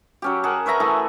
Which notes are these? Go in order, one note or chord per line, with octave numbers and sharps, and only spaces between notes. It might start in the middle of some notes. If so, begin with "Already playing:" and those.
F#3 C#4 G4
G#4 A#4 F#5 A5
B4 C#5 E5 A#5
E3 A3 G#4